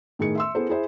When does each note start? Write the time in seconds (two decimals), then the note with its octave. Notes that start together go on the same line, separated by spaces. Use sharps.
0.19 A2 D#3 G#4 C#7
0.35 E5 C6 E6
0.55 B3 E4 G#4 A4 C5
0.69 E4 G#4 C5 E5